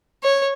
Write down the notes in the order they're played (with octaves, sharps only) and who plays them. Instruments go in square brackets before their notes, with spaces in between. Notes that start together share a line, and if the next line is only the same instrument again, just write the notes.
[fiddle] C#5